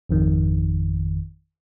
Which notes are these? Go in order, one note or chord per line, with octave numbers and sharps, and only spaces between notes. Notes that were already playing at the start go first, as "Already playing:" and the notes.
G#1 F2 D#3